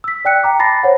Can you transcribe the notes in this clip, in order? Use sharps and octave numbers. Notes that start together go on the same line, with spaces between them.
E6 B6
D5 G5 F#6 C#7
G5 A#5 D6
A5 B5 A6 A#6 C7
C5 C#5 F#5